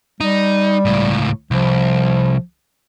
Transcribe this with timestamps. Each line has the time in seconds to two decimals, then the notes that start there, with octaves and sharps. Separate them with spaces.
0.21 G3 D#4
0.85 C#2 A2
1.51 C2 F3